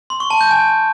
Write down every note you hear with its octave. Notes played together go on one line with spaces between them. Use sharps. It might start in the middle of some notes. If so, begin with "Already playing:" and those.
C6
C#6
A5
G6
G#5